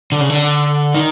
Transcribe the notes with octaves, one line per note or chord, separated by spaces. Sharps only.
D3
C#3
D3
D#3